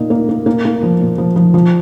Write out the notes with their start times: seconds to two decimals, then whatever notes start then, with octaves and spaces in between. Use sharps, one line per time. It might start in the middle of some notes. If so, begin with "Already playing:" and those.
Already playing: A#2 A#3 D#4
0.10 A#3
0.29 A#3
0.46 A#3
0.65 A#3
0.83 F3
1.00 A#2
1.18 F3
1.36 F3
1.54 F3